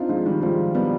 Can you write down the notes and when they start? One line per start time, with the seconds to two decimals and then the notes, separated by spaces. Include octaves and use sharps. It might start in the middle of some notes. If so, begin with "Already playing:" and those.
Already playing: C4 D4 D#4 F4
0.09 F3 G#3
0.26 D#3 G3
0.42 F3 G#3
0.74 G3 B3